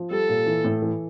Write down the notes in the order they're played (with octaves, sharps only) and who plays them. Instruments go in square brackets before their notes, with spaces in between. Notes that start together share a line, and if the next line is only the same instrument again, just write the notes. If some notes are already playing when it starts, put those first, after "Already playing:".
Already playing: [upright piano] F3
[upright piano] G3 [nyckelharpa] A4
[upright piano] A#2
E3
A2
E3